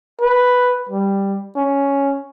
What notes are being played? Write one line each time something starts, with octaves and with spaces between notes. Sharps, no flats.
B4
G3
C#4